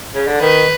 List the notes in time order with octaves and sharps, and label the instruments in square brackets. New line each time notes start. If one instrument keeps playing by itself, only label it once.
[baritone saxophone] C#3
D3
[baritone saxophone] D#3 [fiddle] B4